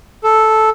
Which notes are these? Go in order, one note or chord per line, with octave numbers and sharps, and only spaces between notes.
A4